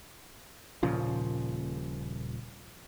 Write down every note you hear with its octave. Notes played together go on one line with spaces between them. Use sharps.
D#1 A#2 C#3 F3